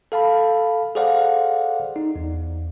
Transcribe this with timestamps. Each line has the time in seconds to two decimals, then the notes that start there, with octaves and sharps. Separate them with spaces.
0.12 A4 F5 A5 B5
0.95 G#4 A4 C5 D5 F5 F#5
1.96 D#4
2.16 E2